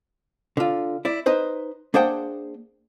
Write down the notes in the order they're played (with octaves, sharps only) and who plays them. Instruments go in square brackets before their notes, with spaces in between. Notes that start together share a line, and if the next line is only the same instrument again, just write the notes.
[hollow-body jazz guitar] D3 F4
E4 D5
D#4 B4 C5
A#3 D4 G#4 C5 F#5 G5